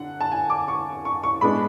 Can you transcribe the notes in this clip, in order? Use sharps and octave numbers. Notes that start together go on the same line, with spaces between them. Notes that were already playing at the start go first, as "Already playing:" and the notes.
Already playing: D3 F#5
A5
G#5
D6
C#6
C#6
C#6
A2 G#3 B3 D4 B5